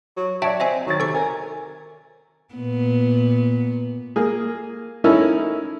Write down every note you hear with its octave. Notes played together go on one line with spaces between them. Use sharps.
F#3
F#3 F#4 C#5 D5 E5 G5 A5
C4 D#5 E5 G#5
D#3 F#3 A6
C3 A4 C#6
A#4 G#5
A#2 B3
A#3 G#4
C#4 D#4 E4 A4 A#4